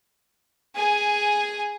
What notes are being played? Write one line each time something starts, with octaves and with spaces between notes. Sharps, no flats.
G#4 G#5